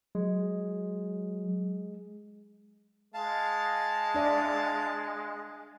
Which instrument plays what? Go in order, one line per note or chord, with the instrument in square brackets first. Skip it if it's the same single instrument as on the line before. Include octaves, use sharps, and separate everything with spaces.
[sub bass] F#3 [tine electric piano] G#3
[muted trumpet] G#3 [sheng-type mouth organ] F5 A5
[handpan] D4 D5 E5